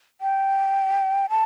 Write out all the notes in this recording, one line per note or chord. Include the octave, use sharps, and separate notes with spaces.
G5
A5